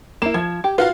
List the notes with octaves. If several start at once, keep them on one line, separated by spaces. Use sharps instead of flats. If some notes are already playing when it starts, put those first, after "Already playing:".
A#3 E4 E7
F3 G#6
G4
F4 F#4 B4 F5